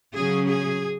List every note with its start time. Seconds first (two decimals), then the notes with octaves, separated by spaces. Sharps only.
0.15 C#3 F#3 C#4 G#4
0.49 G#4